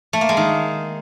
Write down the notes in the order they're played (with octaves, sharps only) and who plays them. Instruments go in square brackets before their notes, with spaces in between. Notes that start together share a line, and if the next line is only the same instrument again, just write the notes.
[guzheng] A3
A#3
G#3
D#3